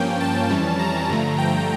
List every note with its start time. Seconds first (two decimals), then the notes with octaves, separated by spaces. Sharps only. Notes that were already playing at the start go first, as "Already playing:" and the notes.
Already playing: G2 F3 A#3 C#4 G5
0.20 A5
0.50 F2 E3 G3 C#4
0.79 A#5
1.09 G2 D3 F3 A3
1.38 G5